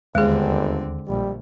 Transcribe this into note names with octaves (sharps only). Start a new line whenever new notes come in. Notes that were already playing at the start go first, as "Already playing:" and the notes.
G1 D#2 D3 G#3 C4 G#4
A#1 G3